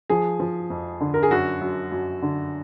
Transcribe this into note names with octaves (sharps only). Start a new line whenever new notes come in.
F3 G#4
F3
F2
D3
A#4
G#4
F#2 F#4
F#2
F#2
D3